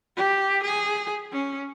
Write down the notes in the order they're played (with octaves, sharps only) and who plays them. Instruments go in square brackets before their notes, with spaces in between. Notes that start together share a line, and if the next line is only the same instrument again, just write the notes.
[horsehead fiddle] G4
G#4
C#4